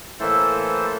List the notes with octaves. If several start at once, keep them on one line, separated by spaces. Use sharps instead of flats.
A2 E3 A#3 A4 C5 E5